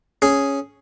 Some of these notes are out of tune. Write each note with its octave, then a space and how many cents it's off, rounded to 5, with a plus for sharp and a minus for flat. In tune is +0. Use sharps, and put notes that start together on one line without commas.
C#4 +0 G#4 +0